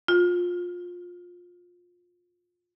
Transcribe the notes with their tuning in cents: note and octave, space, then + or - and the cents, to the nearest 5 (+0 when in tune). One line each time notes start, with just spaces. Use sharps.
F4 +20